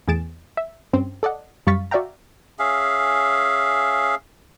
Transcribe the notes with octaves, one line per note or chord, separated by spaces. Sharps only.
E2 A2 G#4 A6 D7 E7
E5
G2 C4 C#4
A4 D5 D#5 F#5
F#2 G3 F5 C#6 A6 B6
F#4 D5 E5 F5 G5 A#5
C#4 G#4 E5 F5